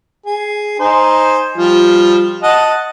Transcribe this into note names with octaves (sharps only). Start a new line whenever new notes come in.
G#4
D#4 C5 G#5
F3 G3
D#5 F#5 A5